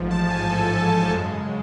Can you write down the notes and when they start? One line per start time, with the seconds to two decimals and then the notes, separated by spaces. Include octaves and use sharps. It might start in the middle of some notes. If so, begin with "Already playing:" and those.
Already playing: A1 G#2 F3
0.11 A5
0.30 G#5
0.50 A4
1.11 F#2 C#3 G#3